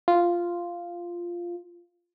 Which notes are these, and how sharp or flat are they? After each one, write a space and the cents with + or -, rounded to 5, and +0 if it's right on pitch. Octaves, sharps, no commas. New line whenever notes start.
F4 -5